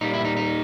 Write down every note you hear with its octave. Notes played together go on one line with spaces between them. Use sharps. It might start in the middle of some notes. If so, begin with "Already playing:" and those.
A#2 G3 A#3 D#4
E4
D#4
D#4